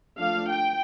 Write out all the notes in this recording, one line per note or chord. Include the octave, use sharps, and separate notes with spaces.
F3 A3 D4 F5
G5